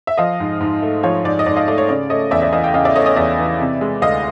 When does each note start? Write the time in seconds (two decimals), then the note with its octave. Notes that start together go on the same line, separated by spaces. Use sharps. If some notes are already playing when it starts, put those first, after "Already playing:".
0.07 E5
0.18 F3 D#5 F5
0.40 G#2
0.61 G#2
0.82 A3
1.03 F3 C#5
1.25 G#2 D5
1.39 D#5
1.46 G#2 D5
1.56 D#5 F5
1.68 A3 D5
1.78 C#5
1.89 C#3 D5
2.10 A3 C#5 D#5
2.31 E2 D5 E5
2.42 D5 E5
2.53 E3 D#5 F5
2.64 F5 G5
2.74 C#3 D#5 F5
2.85 D5 E5
2.96 A3 C#5 D#5
3.06 C#5 D#5
3.16 E2 D5 E5
3.38 E3
3.59 C3
3.81 G#3
4.02 D2 D#5 F5